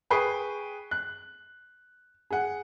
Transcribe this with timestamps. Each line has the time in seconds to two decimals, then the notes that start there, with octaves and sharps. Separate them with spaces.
0.10 G#4 B4 G5 C#6 D#6 C7
0.91 F#6
2.31 G#4 F#5